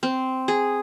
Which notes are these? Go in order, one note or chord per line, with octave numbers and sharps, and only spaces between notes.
C4
G#4